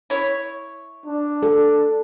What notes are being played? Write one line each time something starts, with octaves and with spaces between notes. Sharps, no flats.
E4 C#5
D4
A4